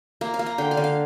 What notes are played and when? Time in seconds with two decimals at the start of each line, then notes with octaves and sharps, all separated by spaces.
0.21 A#3 A#5
0.34 F5
0.39 A#3
0.46 A#5
0.58 D3 G5
0.71 F5
0.77 D3
0.84 F5